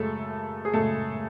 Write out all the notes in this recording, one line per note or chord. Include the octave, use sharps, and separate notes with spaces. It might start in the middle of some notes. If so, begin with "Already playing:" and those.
Already playing: F#2 C#3 G#3 A3 A4
G#4
F#2 C#3 G#3 A3 A4